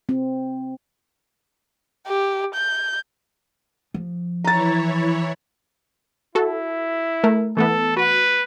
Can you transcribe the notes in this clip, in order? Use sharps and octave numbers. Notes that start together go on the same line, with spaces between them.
C4
G4
G6
F3
E3 E4 C#5 A#5 A6
E4 F#4 A4
A3 A#4
E3 A3 B3 A4
F#4 B4